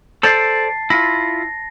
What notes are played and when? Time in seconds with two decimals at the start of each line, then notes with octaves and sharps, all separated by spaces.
0.23 A4 C5 D5 A5 A6 C7
0.90 E4 F4 A#6